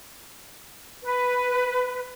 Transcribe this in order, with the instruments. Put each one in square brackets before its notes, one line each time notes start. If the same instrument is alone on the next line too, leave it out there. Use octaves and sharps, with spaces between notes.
[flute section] B4